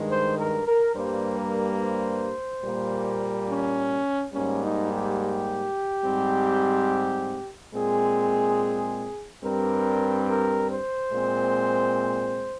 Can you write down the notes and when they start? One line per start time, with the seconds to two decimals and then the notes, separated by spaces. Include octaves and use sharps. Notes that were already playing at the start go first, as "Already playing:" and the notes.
Already playing: G2 D#3 G#3
0.09 C5
0.37 A#4
0.66 A#4
0.94 G2 G3 A#3 C5
1.36 A#4
1.78 C5
2.63 A#2 G3 A#3
3.48 C#4
4.33 G#2 G3 A#3 C#4
4.62 D#4
4.90 G4
5.19 G4
6.03 G#2 G3 C4
7.72 A#2 G#3 C4 G#4
9.42 G2 G3 C4 A#4
10.27 A#4
10.69 C5
11.12 A#2 G#3 C4